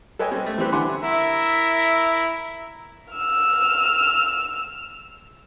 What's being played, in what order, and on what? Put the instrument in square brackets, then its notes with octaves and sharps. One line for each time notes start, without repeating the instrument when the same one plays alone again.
[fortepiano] A4 B4 C#5 D#5 G5 G#5
G3 C4 C#4
A3
E3 G3 C4 G4 B4
D3 E4 F#5 G#5 C6 D6
[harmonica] E4 A#4 E5
[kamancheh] E6 F6